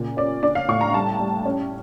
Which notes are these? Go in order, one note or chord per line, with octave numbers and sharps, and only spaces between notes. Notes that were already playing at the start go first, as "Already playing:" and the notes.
Already playing: A#2 C#3
C#4 D5
D4 D5
F5
A2 C#6
A#5
G3 A5
G3
C#4